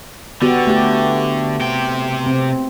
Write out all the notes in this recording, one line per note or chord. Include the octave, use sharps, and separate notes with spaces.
D3 B3 F#4 G4
A3 G4
C3 G5
C4